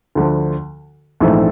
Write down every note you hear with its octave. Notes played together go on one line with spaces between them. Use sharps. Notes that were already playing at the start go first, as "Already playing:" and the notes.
D2 D3 F3
A#1 G#2 E3 A3 C4